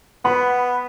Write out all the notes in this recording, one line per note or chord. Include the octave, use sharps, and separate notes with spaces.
B3 B5